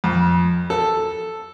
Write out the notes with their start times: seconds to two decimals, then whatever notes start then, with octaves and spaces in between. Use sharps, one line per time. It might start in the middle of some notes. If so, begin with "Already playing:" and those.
0.04 F2
0.70 A4